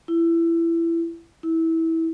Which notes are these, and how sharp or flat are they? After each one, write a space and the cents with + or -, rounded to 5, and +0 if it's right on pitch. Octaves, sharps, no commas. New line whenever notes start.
E4 +20
E4 -20